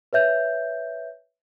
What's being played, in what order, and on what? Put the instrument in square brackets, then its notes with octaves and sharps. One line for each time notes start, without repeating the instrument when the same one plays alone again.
[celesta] B4 C#5 E5 G6